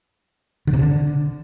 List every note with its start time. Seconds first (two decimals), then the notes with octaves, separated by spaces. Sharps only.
0.67 D3
0.73 C3
0.79 D3